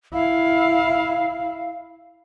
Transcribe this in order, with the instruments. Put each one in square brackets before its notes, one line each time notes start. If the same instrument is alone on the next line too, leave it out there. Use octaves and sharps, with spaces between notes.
[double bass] E4 [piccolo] F5